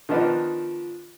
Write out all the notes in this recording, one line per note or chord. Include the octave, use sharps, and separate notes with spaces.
D#3 F3 B3 D4 D#4